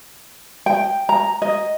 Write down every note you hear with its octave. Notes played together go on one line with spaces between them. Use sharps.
G5
A#5
D#5